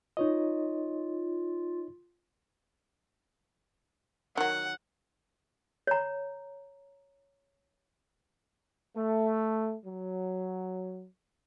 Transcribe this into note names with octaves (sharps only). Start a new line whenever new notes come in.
D#4 F4 C#5 D#5
D#3 F#3 F#5
C#5 A#5
A3
F#3